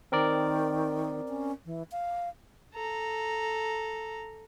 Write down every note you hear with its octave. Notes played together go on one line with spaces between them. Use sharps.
D#3 C4 A#4 D5
C#4
E3
F5
A4 A#5